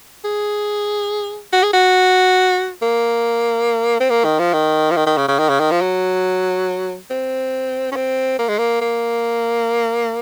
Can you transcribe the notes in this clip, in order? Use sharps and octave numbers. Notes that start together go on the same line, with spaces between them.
G#4
F#4
G#4
F#4
A#3
C4
A#3
D#3
F3
D#3
F3
D#3
D#3
C#3
C#3
D#3
C#3
D#3
F3
F#3
C4
C#4
C4
A#3
G#3
A#3
A#3